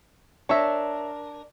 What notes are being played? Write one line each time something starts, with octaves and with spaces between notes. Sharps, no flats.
D4 A#4 C#5 E5